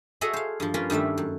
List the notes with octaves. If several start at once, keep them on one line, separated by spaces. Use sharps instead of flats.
F#4 G#4 A4 C#5 D#5 E5
C5 F5
G2 F3
A#3 C#4 F4 A#4 B4
G2 D#3 G3 A3 E5
F#2